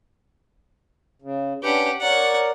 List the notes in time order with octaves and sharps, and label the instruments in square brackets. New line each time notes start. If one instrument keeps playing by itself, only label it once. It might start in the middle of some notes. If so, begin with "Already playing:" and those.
[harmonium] C#3
[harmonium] C#4 D4 B4 [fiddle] G4 F#5
[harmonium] A#4 D5 [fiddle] C#5 F#5